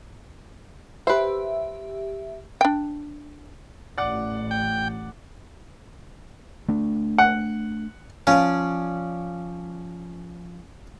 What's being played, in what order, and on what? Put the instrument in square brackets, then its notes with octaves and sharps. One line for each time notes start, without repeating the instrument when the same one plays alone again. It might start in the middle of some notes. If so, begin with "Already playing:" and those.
[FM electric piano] G4 E5 [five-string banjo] B4 C5
[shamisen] D4 G5
[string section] A1 [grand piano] D5 F#5
[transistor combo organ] G5
[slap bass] A3 D4
[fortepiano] F#5
[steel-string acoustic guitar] F3 D5 [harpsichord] C#4 [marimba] F5